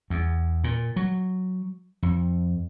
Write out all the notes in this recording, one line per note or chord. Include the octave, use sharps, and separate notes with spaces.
E2
A#2
F#3
F2